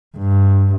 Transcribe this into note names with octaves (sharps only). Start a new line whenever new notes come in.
G2